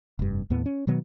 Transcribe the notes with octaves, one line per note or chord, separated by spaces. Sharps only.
F1 G2
D#2 A2 B3
C#4
B2 D#3 F#3 B3